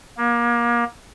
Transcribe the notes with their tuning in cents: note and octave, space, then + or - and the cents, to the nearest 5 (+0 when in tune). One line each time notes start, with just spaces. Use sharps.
A#3 +30